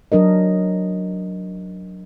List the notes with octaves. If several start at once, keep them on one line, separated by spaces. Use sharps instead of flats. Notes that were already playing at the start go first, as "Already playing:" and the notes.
F#3 D4 A#4 D#5